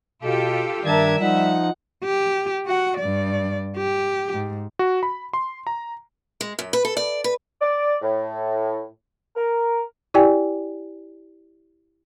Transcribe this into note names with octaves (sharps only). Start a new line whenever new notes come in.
B2 F4 G4 A4
G2 D#3 D4 A#4 E5 A5 G#6
F3 G3 D#4 F#5
G4
F#4 F#5
G2 D5
G4
G#2
F#4
B5
C6
A#5
G#3
F#2
B4
A4
D5
B4
D5
A2
A#4
E4 G4 D5 G5 G#5